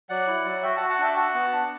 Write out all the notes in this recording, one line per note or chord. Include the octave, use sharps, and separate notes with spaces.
F#3 D5 F#5
E4
F#3
F#4 E5 G5
F#4 F#5 A5
F#5 A5
D4 E5 G5
F#4 F#5 A5
B3
D4